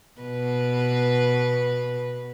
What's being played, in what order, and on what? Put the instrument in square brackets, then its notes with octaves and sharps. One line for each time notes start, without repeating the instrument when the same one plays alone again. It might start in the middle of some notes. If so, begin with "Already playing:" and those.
[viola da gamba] B2 B4